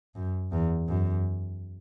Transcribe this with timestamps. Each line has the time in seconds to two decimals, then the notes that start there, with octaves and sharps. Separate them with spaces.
0.15 F#2
0.52 E2
0.88 F#2